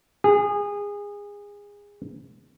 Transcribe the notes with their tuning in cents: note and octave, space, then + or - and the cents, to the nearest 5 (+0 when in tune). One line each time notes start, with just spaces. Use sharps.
G#4 -25